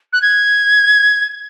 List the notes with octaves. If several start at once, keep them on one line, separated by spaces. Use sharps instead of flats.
F#6
G#6